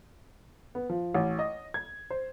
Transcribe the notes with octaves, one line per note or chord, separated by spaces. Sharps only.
B3
F3
A1
D#5
G#6
C5